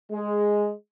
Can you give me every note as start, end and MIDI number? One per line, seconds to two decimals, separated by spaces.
0.12 0.72 56